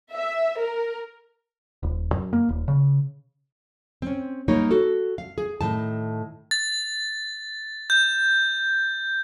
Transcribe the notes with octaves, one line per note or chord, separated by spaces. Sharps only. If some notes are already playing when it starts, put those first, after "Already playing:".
E5
A#4
D#1
F#2
A#3
D#1
C#3
C4 C#4
G3 A#3 D#4 A#4 C#5
F#4 A4
F5
G#4
A2 D#3 A5
A6
G6